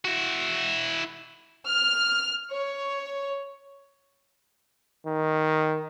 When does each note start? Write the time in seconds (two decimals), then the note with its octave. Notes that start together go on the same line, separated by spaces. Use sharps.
0.05 E4 F#4
1.66 F6
2.52 C#5
5.07 D#3